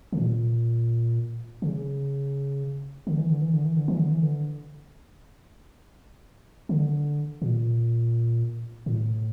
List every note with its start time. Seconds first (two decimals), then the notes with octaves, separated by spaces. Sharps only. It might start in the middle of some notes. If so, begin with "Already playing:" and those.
0.13 C#3
0.18 A#2
1.62 C#3
3.07 D3
3.18 E3
3.30 D3
3.42 E3
3.53 D3
3.65 E3
3.76 D3
3.88 E3
4.00 D3
4.11 E3
4.23 D3
6.69 D3
7.42 A#2
8.86 A2